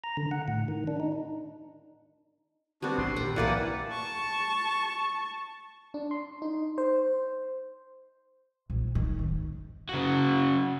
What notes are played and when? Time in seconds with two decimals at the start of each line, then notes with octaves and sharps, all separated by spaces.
0.04 A#5
0.17 D3
0.31 F#5
0.48 A2
0.68 D#3
0.87 D4
1.00 D#4
2.82 G3 B3 C4 D4 F#4
2.98 G#1 B2 D4 C6
3.16 D2 A#2 F#5 G5
3.36 B1 A2 E3 A#3 B4 D5 F#5
3.88 A5 C#6
5.94 D4
6.11 C6
6.42 D#4
6.78 C5
8.70 A#1
8.95 D#3
9.19 D1
9.89 C#3 F#4